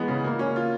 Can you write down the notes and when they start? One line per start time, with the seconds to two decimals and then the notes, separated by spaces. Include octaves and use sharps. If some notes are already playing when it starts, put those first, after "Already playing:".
Already playing: E3 G#3 B3
0.08 C#3
0.24 A#3
0.39 C#4
0.56 F4